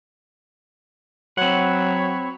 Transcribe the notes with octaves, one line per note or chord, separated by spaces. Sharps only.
F#3 C4 C#5 F#5 B5